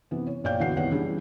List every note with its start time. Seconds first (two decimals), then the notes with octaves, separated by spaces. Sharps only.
0.11 C3 E3 B3
0.27 C#5
0.44 A#1 C#5 D5 F5 G5 G6
0.60 D3 E3 B3 F#4 F#5 C7
0.76 C2 D#3 B3 C#5 F#5
0.92 E3 G3 C#4 D4 E4 G#4